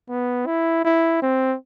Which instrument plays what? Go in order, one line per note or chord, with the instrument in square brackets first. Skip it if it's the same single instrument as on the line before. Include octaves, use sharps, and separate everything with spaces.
[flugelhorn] B3
E4
E4
C4